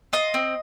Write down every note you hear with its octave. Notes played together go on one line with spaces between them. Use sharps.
F4 D#5
C4